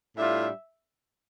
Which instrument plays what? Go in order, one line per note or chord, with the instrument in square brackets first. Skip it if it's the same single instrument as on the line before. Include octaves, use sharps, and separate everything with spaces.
[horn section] A2 G3 D4 F4 [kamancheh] E5